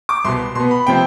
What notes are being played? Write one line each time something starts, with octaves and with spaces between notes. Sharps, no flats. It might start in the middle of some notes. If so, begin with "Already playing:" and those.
D6
C2 B2 B3 C6
B2 B3 C6
B5
C3 F3 C4 G5